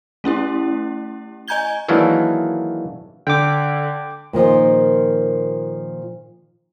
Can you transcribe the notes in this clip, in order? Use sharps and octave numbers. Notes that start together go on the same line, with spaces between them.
A3 C#4 E4 G4
D#5 G#5 A#5 G6 G#6 G7
D#3 E3 F#3 G#3 A#3 D4
D3 G5 D6
A#2 D#3 F3